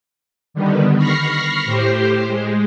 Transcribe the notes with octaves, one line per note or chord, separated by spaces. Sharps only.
D3 D#3 G3 B3
B5 C#6 F6 A#6 C7
A2 G4 C5
G#3